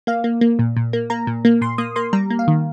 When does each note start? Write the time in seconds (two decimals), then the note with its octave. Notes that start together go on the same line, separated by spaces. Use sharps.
0.07 A#3 F5
0.24 A#3
0.41 A#3
0.59 A#2
0.77 A#2
0.93 A#3
1.10 A#3 A#5
1.27 A#2
1.45 A#3
1.61 A#2 C6
1.78 A#3 D#6
1.96 A#3 C6
2.13 G3 A#5
2.30 A#3
2.39 F5
2.48 D#3